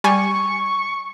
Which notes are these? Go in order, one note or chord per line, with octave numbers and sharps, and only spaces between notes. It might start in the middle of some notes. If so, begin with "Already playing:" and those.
G3 G#5 C#6